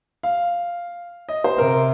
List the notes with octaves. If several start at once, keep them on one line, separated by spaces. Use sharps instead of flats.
F5
D#5
C5
C3 A#4